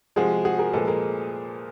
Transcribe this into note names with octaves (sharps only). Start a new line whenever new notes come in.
C3 F3 G#3 F#4 G#4
F#4 G#4
G#4 A#4
A#2 F3 G#3 A4 B4
G#4 A#4